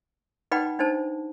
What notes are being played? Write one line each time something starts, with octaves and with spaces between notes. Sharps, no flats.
D#4 B4 D5 F#5 G5 B5
D4 D#4 C5 A5